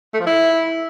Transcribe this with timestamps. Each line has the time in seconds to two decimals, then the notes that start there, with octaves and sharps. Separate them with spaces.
0.14 A3
0.20 F3
0.26 E4